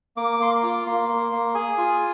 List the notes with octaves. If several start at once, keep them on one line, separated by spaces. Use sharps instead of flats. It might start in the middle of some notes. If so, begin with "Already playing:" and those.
A#3 D6
A#3 C6
D6
F4
A#3 C6
A#3
A#3
G#4 G#5
F4